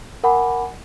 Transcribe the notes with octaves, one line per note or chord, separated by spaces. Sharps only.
A#4 F#5 G#5 B5 D6